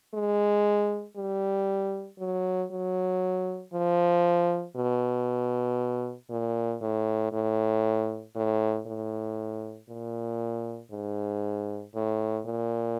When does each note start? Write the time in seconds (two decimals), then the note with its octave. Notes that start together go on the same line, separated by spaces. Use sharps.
0.14 G#3
1.17 G3
2.19 F#3
2.71 F#3
3.74 F3
4.76 B2
6.30 A#2
6.82 A2
7.32 A2
8.35 A2
8.87 A2
9.89 A#2
10.92 G#2
11.95 A2
12.46 A#2